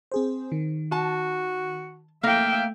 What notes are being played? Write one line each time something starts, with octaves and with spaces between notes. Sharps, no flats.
C4 G#4 C5
D#3
F#4 A5
A3 A#3 E5 F5 G5